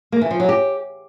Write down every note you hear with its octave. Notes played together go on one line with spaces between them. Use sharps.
A#3
E3
F3
F#3
G4